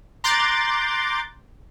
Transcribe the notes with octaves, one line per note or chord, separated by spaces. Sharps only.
A#5 C6 D6 F#6 G6 A6